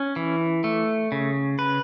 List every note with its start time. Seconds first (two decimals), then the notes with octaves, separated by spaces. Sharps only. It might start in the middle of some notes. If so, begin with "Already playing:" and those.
Already playing: C#4
0.16 E3
0.64 A3
1.12 C#3
1.59 B4